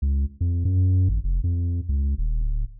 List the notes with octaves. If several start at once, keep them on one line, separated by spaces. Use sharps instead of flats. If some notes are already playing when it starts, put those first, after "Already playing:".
C#2
F2
F#2
G#1
F1
F2
C#2
D#1
D1